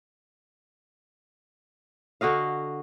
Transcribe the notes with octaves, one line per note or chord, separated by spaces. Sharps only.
D3 F#4 D#5 F5